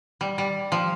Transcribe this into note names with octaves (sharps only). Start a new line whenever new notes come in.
G3
G3
F3